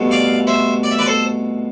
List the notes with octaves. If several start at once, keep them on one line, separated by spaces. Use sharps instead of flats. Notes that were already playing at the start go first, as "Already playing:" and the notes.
Already playing: C2 B2 A3
D5 F5
C5 E5
D5
E5
B4 D5
A4 C5